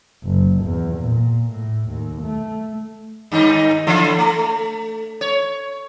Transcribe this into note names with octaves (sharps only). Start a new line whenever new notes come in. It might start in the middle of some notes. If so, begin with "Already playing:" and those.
F#1
E2
A#2
A2
D#2
A3
G2 D#3 D#4
D3 E3 E4
A3
C#5